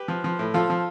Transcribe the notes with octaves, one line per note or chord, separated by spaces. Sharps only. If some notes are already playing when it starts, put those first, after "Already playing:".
Already playing: G4 B4
F3
F3
A2
F3 F4 A4
F3